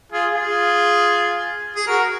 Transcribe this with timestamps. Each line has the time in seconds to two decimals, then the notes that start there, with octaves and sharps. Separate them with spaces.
0.12 F4 G#4
0.35 F4 G#4
1.76 G#4
1.87 F#4 A#4